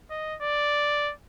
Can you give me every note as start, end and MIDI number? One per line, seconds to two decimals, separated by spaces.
0.10 0.36 75
0.42 1.13 74